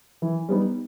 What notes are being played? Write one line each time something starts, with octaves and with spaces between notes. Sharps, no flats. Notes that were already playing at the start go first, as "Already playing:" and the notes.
E3
G3 B3 D#4